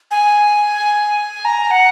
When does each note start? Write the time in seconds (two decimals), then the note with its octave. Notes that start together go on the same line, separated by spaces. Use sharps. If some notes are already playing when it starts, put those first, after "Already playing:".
0.11 G#5
1.45 A#5
1.70 F#5